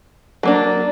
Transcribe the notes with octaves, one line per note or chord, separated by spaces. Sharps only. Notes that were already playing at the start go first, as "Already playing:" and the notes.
F#3 A#3 D4